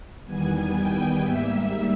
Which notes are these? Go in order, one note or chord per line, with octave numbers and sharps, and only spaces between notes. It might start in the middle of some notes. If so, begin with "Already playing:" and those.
E2 D#3 G3 B3 G#5
G5
G#2 G3 A#3 E5